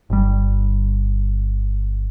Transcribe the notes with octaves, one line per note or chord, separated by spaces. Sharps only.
G1 G3